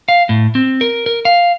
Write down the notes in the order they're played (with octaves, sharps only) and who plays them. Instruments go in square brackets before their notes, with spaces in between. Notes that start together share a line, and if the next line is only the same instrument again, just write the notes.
[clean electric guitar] F5
A2
C4
A#4
A#4
F5